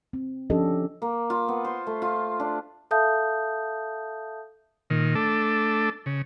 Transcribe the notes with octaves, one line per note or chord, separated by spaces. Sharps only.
C4
F3 C#4 D4 G4 A4 D#5
A#3
F4
B3
C5
A3
F4
D4
A4 E5 F5 A5 D#6 G6
A#2 D#3
A3 D4 A4
C#3